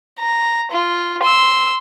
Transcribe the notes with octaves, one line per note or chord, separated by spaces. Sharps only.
A#5
F4
C6 E6